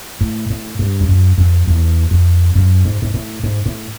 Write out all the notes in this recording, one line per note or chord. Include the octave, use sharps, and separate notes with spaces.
A2
A2
G2
F2
F#2
F2
E2
F2
F#2
G#2
G#2
A2
G#2
A2